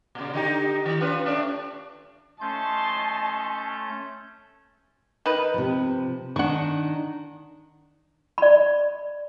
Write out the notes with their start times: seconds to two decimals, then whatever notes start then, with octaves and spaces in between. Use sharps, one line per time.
0.15 A#2 C#3
0.33 D3 D#4 G4
0.86 D#3
1.01 C#4 F4 B4
1.25 A3 C#4 D4
2.41 A3 C#4 D#5 A5 C6 G6
5.26 D#3 B4
5.54 C3 F3
6.36 D#3 D4 F#5 C#6
8.38 D5 B5